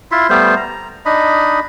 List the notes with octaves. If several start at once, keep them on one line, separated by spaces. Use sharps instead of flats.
E4 F4 E5 C6
G3 A3 B3 C5
A#5
D4 D#4 D#5 B5